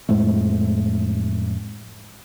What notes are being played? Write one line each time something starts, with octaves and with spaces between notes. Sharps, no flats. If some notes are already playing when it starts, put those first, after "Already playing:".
F2 A2 G#3 A3